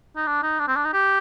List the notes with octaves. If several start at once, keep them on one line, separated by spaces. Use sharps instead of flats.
D#4
D4
D#4
D4
C4
D4
D#4
G4